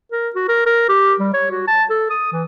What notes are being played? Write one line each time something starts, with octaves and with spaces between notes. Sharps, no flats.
A#4
F#4
A#4
A#4
G4
G3
C#5
F#4
A5
A4
D#6
E3